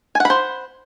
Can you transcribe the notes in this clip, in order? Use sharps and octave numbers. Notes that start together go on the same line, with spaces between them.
C5 F#5 G#5 B5